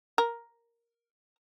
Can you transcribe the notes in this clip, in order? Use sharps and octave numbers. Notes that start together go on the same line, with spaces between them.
A#4